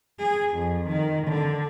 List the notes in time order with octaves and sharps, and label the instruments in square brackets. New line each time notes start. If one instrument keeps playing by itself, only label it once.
[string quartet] G#4
F2
D#3
D3